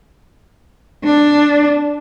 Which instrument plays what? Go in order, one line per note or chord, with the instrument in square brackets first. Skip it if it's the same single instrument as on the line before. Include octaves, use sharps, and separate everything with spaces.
[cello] D4